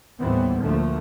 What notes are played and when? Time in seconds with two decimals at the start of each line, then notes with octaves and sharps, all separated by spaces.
0.20 D#2 A2 E3 G3 B3 C4
0.62 D2 D3 F3 A3 A#3